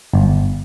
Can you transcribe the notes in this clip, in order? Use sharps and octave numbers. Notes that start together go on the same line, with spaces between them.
G1